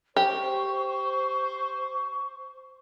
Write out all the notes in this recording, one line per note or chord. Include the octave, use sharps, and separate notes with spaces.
G4 C5 C#6